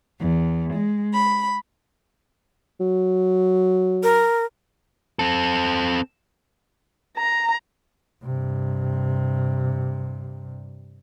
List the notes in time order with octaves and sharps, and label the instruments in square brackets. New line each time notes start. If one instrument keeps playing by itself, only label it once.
[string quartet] E2
G#3
B5
[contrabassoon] F#3
[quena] A#4
[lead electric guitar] C4 A4
[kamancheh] A#5
[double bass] G2 C3